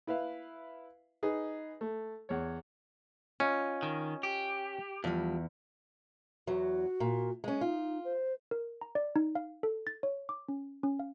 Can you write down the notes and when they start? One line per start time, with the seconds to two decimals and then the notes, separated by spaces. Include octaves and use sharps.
0.07 E4 B4 E5 F5
1.23 D#4 G#4 B4
1.81 A3
2.29 E2 C#5
3.40 C#4 F4 D#5
3.83 D#3
4.23 G4
5.04 E2 F3 G3
6.47 E2 F#3 F#4
7.00 A#2
7.44 G#3 C#4
7.61 D#4 F4
8.05 C5
8.51 A#4
8.81 A#5
8.95 D5
9.16 D#4
9.35 F5
9.63 A4
9.87 A6
10.03 C#5
10.29 D6
10.49 C#4
10.83 C#4
10.99 F5